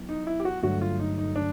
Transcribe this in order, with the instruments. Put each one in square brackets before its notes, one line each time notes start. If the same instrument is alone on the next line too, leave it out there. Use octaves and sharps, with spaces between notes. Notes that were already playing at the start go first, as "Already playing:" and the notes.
Already playing: [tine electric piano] F#3 B3 E4
[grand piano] D#4
E4
G4
F#4
[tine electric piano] G2 D3 F#3 A3 [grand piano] F#4
[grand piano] F4
D#4
D#4
D4